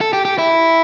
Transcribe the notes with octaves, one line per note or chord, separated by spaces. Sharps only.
A4
G4
G4
E4